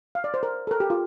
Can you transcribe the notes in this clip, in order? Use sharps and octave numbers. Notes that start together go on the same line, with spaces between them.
F5
D5
C5
A#4
A4
A#4
G4
F4